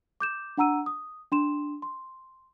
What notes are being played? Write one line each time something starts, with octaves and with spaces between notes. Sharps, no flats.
D6 G6 E7
D4 F#5 A#5 E6 D#7
D#6
D4 C6 E7
C6